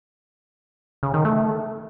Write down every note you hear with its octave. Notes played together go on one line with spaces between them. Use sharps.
C#3
D#3
A3